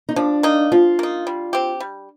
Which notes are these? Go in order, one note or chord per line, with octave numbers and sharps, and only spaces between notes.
D#4
F3 D4
A#3 D#4
F3 F4
A#3 D#4
G3
C4 G4
G3